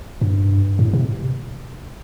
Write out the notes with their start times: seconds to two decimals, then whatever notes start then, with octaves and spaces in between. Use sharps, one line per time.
0.21 G2
0.79 A2
0.93 C3